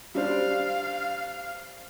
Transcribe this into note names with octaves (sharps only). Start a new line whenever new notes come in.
G3 D4 C5 F5